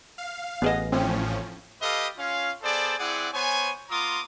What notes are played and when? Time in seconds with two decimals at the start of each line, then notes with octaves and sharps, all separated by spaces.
0.18 F5
0.62 A1 B3 G#4 D#5
0.92 A2 F3 C4 C#4
1.81 G4 A4 B4 D#5 F5
2.17 C#4 F4 F5
2.63 B3 G#4 A4 C5 D5
2.99 C4 E4 G#4 D5 F#5
3.33 B3 C5 C#5 G#5
3.90 B3 F4 A#5 C6 D6 D#6